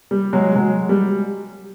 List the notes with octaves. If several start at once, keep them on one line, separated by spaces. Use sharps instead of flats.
G3
F#3 G#3
F#3 G#3
G3